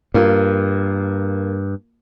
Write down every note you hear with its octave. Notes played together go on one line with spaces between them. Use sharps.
G2 A#3 F4